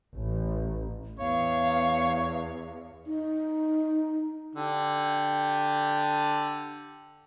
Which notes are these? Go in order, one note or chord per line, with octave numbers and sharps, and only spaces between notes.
A1
E2 C#5 F5
D#4
D3 G4